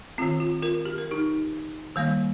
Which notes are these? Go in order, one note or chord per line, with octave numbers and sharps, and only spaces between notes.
D#3 C4 F4
F4
F4 A#4
G4
A#4
D#4 G4
D#3 G3 A#3